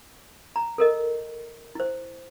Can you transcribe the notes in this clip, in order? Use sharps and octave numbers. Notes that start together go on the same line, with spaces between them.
A#5
A4 A#4 D#5
E4 C5